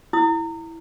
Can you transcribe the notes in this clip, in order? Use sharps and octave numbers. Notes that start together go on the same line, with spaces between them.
E4 D#6